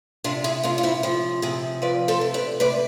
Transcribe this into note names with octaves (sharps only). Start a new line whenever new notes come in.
C3 D4 F4
E4 G#4
C3 D4 F4
F4
C4 E4
F3 C4 E4
C3 E4 G#4
F3 B4 D5
A4 C5
C3
B4 D5
C3 B4 D5